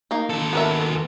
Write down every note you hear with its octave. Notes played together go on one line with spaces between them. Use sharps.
A#3 D#4
D#2 A4
B3 A#4 E5